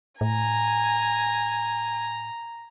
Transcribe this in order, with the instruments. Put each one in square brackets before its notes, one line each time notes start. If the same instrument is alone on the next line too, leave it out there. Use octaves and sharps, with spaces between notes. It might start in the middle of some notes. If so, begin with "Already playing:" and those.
[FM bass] A2 [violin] G#5 [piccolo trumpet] A#5